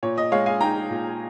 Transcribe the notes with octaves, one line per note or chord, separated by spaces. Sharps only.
A#2 C#5
D#5
G#3 C#5 F5
F5 G#5
D#4 G5 A#5
A#2